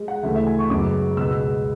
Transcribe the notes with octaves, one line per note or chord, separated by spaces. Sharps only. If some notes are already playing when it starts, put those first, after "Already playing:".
Already playing: G#3
F#5
D2 C#3 E3 A3 E5
E5
G#5
C#6
F#2 C#3 G#3 B3 D6
C#2 B2 G#3 B3 E6